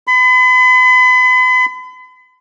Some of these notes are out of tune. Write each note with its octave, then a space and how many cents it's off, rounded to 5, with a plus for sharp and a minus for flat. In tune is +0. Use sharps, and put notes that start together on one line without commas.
B5 +40